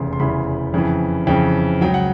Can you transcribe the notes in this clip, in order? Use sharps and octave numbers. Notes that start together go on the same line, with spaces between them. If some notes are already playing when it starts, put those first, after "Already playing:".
Already playing: F1 E2 C#3 E3 C6
C6
F1 E2 C#3 E3 B5
F2 C#3 E3
F2 C#3 E3 G5
C#2 C#3 F#3 G5
F#5